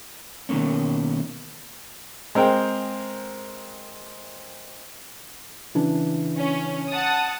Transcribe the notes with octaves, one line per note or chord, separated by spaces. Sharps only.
B2 D#3 F3 A#3 C#4
G#3 C4 A#4 C5 G5
C#3 E3 D4
C#4
F#5 A5 D#6